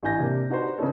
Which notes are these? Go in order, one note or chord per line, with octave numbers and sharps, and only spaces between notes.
A1 A2 D3 G#5 G6 A#6
C3 A#3 D4 G4
D4 D#4 F#4 G4 B4 C5
C#3 B3 D4 D#4 A4 C#5